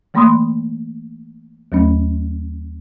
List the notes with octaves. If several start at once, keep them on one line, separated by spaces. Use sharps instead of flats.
E3 A3 A#3 B5 C6 D#6
D#2 F#3 A3 C#4